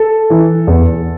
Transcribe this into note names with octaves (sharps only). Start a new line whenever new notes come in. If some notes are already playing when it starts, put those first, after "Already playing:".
Already playing: A4
E3
E2